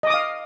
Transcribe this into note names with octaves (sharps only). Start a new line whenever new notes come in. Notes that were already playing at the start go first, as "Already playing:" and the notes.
D#5 F5 D6 D#6